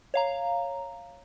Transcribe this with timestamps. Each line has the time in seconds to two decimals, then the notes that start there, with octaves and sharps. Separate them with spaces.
0.14 C#5 F5 A#5